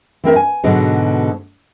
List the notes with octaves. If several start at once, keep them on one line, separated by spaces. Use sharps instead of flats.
E3 C4 A#4 E5
G#5
G#2 B2 D3 F#3 G#3